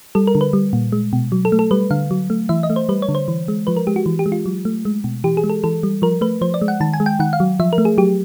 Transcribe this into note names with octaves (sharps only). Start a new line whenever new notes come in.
G3 A4
A#4
D3
B4
G3
A#2
G#3
B2
F#3
A4
A3
A4
G3 B4
D3 F5
F#3
A3
E3 E5
D#5
A3
C5
G3 B4
C#5
D3
C5
E3
G#3
F3 B4
A#4
G#3 G4
F#4
E3
G4
G#3
F4
F#3
A3
G#3
B2
E3 G4
G#4
G#3
A4
E3 A4
G3
F3 A#4
A3 B4
F3 C5
D5
G#3
F#5
D#3 A5
G#5
G#3
G5
D#3 F#5
F5
F#3
F3 E5
A#4
A3
G#4
F#3 G4